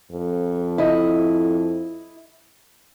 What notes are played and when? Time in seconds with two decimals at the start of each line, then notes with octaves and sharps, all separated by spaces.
0.11 F2
0.78 E4 D#5